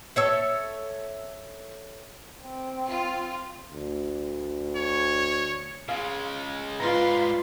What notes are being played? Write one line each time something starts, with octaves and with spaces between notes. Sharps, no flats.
A4 C#5 E5
C4
F4
D2
C#5
C#3 G#3 F5
G#2 G3 F4 B4 F5 A#5 C6